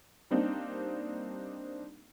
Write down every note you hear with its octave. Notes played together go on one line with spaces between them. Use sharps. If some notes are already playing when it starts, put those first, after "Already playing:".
G3 A#3 C4 D4 D#4